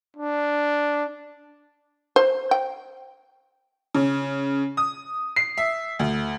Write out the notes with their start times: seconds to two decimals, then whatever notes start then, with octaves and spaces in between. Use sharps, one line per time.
0.17 D4
2.16 C5
2.51 G5
3.95 C#3
4.77 D#6
5.36 C7
5.58 E5
5.99 D2